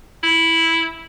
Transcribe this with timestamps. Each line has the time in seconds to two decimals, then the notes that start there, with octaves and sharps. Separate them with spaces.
0.23 E4